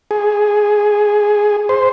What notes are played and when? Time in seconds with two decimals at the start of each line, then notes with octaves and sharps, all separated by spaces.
0.11 G#4
1.69 C5